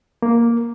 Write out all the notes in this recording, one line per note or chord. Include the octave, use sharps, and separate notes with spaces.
A#3